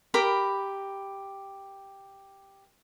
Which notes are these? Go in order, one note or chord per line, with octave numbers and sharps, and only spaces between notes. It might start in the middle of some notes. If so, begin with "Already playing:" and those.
G4 A#4 B5